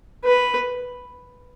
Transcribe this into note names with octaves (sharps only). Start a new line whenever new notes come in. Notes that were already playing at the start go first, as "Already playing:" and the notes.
B4